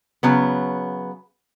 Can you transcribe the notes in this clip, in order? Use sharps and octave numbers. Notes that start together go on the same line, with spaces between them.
C#3 F#3 B3